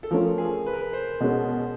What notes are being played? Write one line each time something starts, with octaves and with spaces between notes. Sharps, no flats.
A4
F3 A3 C#4 F4 A#4
G#4
B4
A#4
B4
C5
B2 G#3 C#4